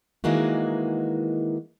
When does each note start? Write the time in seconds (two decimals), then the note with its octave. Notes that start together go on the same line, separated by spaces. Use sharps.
0.24 D#3 E3 G#3 A#3 F#4